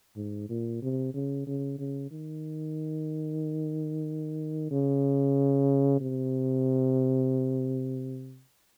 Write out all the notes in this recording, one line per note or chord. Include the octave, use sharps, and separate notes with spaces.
G#2
A#2
C3
C#3
C#3
C#3
D#3
C#3
C3